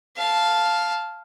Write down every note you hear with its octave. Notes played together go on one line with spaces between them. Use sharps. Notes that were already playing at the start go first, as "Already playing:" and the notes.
F5 A5